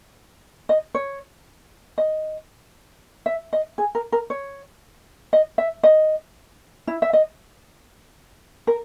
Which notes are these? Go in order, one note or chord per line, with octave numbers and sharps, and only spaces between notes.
D#5
C#5
D#5
E5
D#5
G#4
A#4
A#4
C#5
D#5
E5
D#5
E4
E5
D#5
A#4